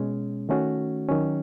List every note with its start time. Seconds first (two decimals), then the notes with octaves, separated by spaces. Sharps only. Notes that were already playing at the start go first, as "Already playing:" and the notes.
Already playing: B2 G#3 C#4
0.49 D#3 A3 C#4 F#4
1.08 D#3 F#3 C#4